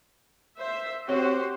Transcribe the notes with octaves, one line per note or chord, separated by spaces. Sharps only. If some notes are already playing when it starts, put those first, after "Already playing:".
C5 E5
C4 F#4 G4 C5 C#5